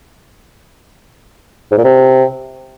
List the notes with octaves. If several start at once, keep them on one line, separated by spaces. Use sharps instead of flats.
G#2
A#2
C3